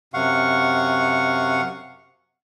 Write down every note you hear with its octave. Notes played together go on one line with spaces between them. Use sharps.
F#2 C3 F5 F#5 C#6